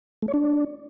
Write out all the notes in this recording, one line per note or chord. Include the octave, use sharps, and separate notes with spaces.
A3
C#5
D4